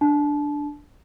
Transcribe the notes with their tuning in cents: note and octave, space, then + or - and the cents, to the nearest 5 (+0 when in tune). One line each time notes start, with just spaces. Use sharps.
D4 +0 A5 -30